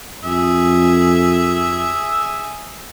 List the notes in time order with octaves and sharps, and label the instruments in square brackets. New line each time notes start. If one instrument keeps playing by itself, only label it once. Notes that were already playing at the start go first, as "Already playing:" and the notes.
[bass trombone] F2 [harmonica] G#4 E5